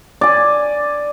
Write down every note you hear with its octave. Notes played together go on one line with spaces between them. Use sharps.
D5 G#5